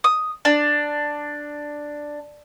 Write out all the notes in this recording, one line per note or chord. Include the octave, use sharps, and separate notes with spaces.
D#6
D4